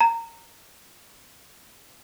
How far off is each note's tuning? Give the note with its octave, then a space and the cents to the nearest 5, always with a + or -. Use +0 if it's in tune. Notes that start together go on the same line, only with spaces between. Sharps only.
A#5 -20